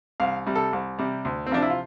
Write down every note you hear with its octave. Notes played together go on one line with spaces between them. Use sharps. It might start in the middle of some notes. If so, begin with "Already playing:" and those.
C2 F5
C3 G3
A4
C2
C3 G3
D2
C4
C3 F3 D4
E4
F4